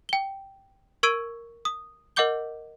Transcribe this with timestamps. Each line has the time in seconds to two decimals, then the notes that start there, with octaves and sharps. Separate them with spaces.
0.09 G5 G7
1.03 A#4 C#6 E6 G#6 D7 D#7
1.65 D#6
2.16 A#4 D#5 F#5 D6 G6 G7